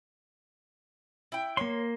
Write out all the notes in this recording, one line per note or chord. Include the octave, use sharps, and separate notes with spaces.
E4 G5
A#3 C#5 C6